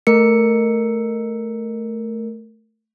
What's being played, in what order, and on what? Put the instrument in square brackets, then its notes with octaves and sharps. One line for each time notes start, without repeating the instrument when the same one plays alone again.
[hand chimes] A3 A#4 C#7